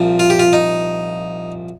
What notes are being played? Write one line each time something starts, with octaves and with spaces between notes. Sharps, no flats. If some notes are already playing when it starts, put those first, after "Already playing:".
Already playing: C2 A#2 F3
F4
G4
F4
D#4